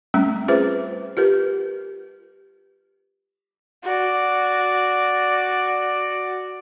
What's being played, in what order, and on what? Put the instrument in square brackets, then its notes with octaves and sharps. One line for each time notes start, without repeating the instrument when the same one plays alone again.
[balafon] G3 A3 C4 C#4 E5
F4 G#4 B4 C5 E5
F4 G4 A#4 B4
[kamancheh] F#4 D5